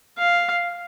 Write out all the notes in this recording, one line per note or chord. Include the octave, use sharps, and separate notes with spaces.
F5